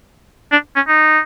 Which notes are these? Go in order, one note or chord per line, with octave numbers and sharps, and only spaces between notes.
D4
C#4
D#4